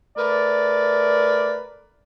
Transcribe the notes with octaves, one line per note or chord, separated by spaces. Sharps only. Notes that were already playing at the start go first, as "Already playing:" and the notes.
A3 A#4 B4 D5